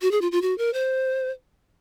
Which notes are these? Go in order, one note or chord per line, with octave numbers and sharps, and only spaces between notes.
F#4
G#4
F4
F4
F#4
A#4
C5